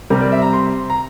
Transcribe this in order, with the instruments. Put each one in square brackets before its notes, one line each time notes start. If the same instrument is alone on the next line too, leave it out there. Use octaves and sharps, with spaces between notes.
[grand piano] C3 G3 C4 A#4
D5
E5
A#5
C6
A#5